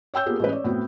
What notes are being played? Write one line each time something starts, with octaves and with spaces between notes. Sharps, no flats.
C#5 G5 E6 G6
A#3 B3 F4 G4 G#4
A1 G#3 B4
C#5 D5
A2 B3 C4 F#4